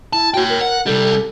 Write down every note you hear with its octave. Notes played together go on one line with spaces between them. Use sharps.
E4 A5
F#4 C#5 G5
A#4
F#5
C2 G3 A4